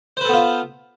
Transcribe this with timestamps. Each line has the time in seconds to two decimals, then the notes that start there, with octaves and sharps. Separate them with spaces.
0.17 C5
0.21 B4
0.25 A4
0.29 B3
0.33 F4